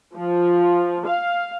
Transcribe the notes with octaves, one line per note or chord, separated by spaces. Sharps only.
F3
F5